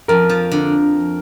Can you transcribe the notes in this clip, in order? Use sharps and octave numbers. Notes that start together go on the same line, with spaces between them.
F2 A#4
F3
D3